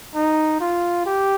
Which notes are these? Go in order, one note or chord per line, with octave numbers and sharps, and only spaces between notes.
D#4
F4
G4